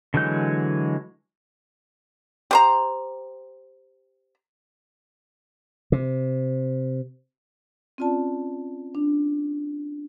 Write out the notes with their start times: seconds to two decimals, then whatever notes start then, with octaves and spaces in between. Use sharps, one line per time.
0.14 D3 E3 F#3 G#3 G6
2.51 G4 C5 A#5
5.92 C3
7.98 C4 C#4 F4 D5 A5
8.95 D4